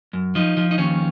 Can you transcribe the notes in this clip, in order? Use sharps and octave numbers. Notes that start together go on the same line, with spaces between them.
F#2
F3 D#4
F3
D#4
D#2 C#4